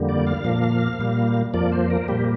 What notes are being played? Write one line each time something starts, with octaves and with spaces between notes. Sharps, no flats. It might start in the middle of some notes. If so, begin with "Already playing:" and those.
Already playing: F2 D3 G3 A#3
D5
F5
A#2 F3 A#3
A#2 G3 A#3
F2 F3 A#3 D5
C5
A#4
A#2 G3 A#3 G4